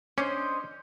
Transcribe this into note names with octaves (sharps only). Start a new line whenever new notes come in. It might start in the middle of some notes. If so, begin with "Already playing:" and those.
C#4 D4 C5 D#5